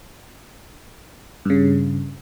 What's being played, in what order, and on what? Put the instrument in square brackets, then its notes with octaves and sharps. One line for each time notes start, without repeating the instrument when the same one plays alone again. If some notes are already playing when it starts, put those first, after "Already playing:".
[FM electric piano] G2 C#3